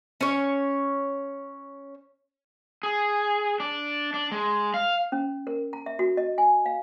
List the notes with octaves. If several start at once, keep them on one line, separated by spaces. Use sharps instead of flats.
C#4 C#5
G#4
D4
D4
G#3
F5
C#4
A#4
A#5
E5
F#4
D#5
G#5
F5